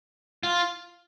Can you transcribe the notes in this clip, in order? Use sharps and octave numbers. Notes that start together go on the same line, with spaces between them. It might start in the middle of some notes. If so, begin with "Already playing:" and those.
F4